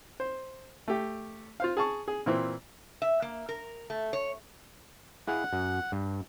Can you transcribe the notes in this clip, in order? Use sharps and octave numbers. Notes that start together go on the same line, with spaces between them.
C5
A3 G4
F4 C5 F5
G#4 A5 C#6
G#4
A#2 E3 C4
E5
A#3
A#4
A3
C#5
E4 G#4 F5 F#5
F#2
G2